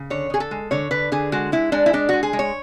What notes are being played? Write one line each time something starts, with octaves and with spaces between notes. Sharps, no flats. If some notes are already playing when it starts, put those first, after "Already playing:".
Already playing: C#3
D3 C#5
D3 G#4
A4
G#3
D3 C#5
D3 B4
D3 G#4
G#3 F#4
G#3 E4
G#3 D4
E4
G#3 D4
G#3 F#4
G#4
G#3
C#5